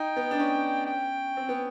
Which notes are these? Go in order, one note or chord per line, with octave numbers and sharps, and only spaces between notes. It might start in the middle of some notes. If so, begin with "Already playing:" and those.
Already playing: D#4 G5
B3
D4
C#4
G5
C4
B3